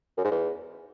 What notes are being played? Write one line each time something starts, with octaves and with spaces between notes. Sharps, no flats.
F#2
G#2
E2